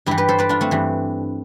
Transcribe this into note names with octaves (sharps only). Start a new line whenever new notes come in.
G2 E3 E4 G4
G4 B4
A4 C5
B4 D5
D4 F4
A3 C4
G2 E3